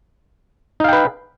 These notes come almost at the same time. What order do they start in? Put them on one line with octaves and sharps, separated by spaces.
D#4 F5 G5 B4